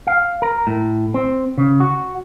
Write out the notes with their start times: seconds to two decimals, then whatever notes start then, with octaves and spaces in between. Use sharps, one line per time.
0.07 F5
0.42 A#4
0.67 A2
1.14 C4
1.58 C#3
1.80 F#4